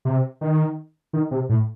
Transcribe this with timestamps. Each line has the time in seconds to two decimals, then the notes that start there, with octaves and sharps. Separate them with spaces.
0.05 C3
0.41 D#3
1.13 D#3
1.31 C3
1.49 A2